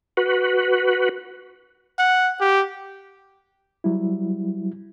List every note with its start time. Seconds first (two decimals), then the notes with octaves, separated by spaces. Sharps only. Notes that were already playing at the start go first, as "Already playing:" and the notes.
0.17 F#4 B4
1.99 F#5
2.40 G4
3.84 F#3 G3 E4